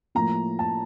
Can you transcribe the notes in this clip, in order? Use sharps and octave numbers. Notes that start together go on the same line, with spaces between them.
A2 F3 A#3 A#5
A5